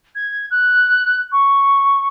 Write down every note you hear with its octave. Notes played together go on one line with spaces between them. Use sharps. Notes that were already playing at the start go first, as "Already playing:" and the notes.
G#6
F#6
C#6